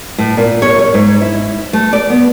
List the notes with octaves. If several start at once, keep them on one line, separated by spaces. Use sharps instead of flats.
A2
A#2
C#5
C#5
G#2
E4
A3
D5
B3